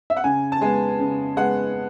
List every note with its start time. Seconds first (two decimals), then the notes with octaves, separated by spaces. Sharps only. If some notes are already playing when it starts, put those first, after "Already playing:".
0.10 E5
0.17 F#5
0.24 C#3 G#5
0.52 A5
0.61 G#3 B3 G#5
0.99 C#3
1.37 G#3 B3 F#5